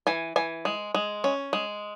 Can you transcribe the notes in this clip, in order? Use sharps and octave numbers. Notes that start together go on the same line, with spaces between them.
E3 G#5
E3 G#5
G#3
G#3
C#4
G#3